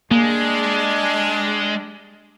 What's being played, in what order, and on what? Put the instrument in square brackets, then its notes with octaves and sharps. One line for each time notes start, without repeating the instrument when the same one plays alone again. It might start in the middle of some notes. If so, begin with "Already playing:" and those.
[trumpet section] G3 D4 [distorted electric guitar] G#3 [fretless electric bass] A#3